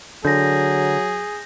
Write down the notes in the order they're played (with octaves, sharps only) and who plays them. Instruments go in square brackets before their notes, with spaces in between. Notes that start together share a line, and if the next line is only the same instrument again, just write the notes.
[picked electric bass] D3 [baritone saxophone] F#3 [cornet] G#4 [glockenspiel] G6 A#6